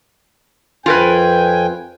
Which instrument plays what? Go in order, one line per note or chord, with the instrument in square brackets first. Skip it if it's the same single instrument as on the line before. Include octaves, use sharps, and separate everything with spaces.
[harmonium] F2 G5 G#5 [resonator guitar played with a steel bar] F4 A#4 B4